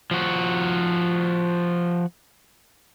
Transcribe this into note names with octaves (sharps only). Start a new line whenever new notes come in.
F3 F#4